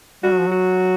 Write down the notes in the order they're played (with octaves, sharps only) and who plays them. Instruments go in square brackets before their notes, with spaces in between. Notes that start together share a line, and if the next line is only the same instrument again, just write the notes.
[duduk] G3 [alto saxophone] F#4
[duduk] F#3
F3
[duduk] F#3 [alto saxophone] F#4